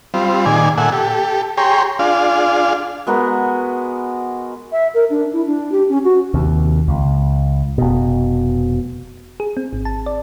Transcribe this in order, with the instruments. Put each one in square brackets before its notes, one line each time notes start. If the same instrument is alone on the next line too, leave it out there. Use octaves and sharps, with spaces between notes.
[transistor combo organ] G3 C4 F4
A#2 D#3 G#4 D5 G#5
A#2 A4 E5 F#5 G#5
G4 A4
G4 G#4 C#5 G5 A#5 C6
D4 F4 G#4 F5
[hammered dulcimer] G#3 B3 F#4 A#4
[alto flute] E5
A#4
D4
E4
D4
G4
C#4
F#4
[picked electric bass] D#2 C3
C#2
F1 B2
[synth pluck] G#4
C4
G#1
A5
D5